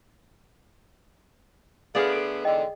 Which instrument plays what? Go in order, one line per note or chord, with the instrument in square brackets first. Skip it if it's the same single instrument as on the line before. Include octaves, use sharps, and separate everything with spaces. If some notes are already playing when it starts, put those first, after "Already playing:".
[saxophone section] D3 A3 B3 [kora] G#4 D5 [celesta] F5 B5 F6
[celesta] A4 D7
[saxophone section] E2 G#2 D3 [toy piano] D#5 [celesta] G5